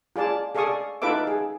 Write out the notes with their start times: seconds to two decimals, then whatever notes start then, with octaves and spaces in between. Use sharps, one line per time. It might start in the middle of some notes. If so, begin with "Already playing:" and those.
0.16 F4 G#4 D5 A5
0.55 G#4 A4 D5 F5 C#6 D#6
1.02 D#4 F4 A4 B4 E5 D6
1.27 G#4